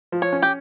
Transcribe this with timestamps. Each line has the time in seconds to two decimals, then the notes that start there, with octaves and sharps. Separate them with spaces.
0.12 F3
0.22 C#5
0.33 C#4
0.43 G4